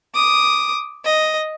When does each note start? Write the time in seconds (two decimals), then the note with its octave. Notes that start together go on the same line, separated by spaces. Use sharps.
0.15 D6 D#6
1.05 D#5